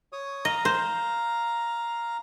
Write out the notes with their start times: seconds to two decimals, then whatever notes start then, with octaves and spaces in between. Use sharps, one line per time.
0.12 C#5 D#6
0.45 D#5 F5 A#5
0.65 C5